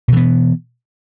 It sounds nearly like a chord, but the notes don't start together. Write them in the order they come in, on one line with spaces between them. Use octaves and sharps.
B2 E3 B3